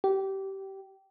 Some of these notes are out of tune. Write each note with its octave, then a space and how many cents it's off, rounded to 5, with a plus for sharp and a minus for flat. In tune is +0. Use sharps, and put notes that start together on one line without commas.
G4 -20